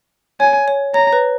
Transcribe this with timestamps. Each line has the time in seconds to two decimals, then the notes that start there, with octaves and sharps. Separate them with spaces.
0.40 C#5 G#5
0.68 C#5
0.94 C#5 A#5
1.13 B4